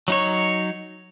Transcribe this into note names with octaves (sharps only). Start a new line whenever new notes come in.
F#3 D#4 C#5